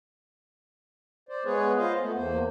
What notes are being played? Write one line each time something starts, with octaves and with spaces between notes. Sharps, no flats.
C5 D5
G#3 B3 G#4 B4 C#5
F4 C5 D#5 F5
A3 B3
E2 A#3 C5